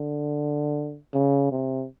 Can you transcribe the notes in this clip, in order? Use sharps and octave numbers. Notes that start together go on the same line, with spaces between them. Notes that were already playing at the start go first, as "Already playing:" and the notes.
Already playing: D3
C#3
C3